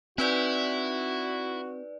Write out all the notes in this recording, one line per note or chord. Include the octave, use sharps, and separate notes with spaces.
C4 D#4 E4 F#4 B4 D5